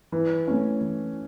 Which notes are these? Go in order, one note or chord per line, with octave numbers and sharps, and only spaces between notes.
E3
A3 C#4
E3